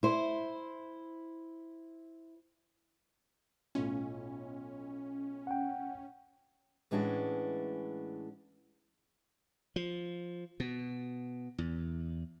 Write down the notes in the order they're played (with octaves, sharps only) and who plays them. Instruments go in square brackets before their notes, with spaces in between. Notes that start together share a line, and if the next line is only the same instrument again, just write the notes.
[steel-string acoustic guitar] E4 C5
[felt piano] B1 A2 F4 [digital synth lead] C#4
[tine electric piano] F#5 G5
[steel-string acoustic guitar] A2 E3 G#3 C#4 D4 F#4
[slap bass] F3
B2
E2